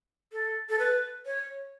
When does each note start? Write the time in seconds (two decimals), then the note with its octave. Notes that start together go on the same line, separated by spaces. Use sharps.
0.33 A4
0.69 A4
0.79 B4
1.26 C#5